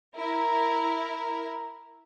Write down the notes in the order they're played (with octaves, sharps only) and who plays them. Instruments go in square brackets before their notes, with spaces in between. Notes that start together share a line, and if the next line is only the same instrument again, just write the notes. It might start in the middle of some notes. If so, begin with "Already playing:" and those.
[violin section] E4 A#4